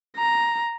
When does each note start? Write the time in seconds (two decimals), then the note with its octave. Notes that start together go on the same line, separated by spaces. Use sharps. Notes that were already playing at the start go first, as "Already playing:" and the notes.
0.17 A#5